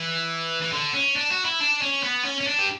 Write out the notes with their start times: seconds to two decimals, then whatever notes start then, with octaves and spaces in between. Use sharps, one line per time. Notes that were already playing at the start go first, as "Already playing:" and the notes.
Already playing: E3
0.62 E3
0.73 D3
0.94 C#4
1.16 D4
1.30 F#4
1.45 E4
1.60 D4
1.81 C#4
2.03 B3
2.24 C#4
2.41 C#4
2.47 D4
2.59 G4